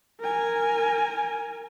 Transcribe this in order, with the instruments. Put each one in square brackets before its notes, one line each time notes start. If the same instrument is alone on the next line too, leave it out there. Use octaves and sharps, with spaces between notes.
[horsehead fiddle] A#4 G#5